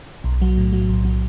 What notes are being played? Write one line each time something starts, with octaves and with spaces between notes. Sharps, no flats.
B1
F#3
A2
F#3
B1
F#3